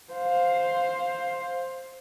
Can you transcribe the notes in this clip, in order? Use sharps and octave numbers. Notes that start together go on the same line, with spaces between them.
C5 F5